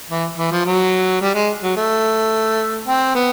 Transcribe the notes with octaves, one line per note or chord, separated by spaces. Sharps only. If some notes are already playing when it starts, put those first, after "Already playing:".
E3
E3
F3
F#3
G3
G#3
F#3
A3
C4
B3